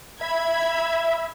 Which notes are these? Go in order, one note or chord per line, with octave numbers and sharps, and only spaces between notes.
E5 B5 G#6